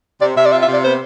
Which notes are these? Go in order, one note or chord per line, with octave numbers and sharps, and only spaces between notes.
C3 D5
C3 E5
D5
F4 E5
E5
C3
D5
B3 C5